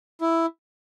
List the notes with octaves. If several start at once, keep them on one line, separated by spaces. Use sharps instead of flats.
E4